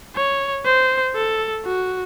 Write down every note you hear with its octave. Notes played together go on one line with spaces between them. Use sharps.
C#5
C5
A4
F#4